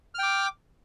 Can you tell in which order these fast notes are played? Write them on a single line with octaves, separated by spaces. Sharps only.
F6 G5 D6